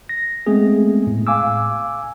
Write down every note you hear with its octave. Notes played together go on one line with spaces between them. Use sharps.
A#6
G#3 A3 B3 C4 G#4
A2
F5 G#5 D6 E6